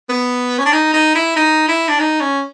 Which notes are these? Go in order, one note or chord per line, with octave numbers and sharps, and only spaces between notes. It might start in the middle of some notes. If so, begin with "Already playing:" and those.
B3
C#4
D4
D#4
D#4
E4
D#4
E4
D4
D#4
C#4